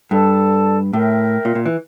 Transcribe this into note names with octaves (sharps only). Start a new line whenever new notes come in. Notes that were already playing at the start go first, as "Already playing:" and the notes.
G2 A4 D5 A5
A2 A#4 E5 G5
A#2
A#2
E3